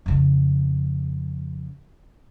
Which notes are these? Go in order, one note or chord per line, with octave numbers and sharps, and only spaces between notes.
F2 C#3